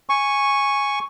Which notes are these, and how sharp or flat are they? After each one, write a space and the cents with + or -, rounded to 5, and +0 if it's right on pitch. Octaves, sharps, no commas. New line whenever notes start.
G#5 -5 C#6 +0